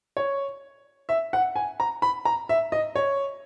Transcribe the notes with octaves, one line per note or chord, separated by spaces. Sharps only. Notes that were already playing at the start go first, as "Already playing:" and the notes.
C#5
E5
F#5
G#5
A#5
B5
A#5
E5
D#5
C#5